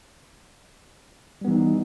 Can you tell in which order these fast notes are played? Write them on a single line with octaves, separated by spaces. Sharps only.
G3 B3 E3 D#4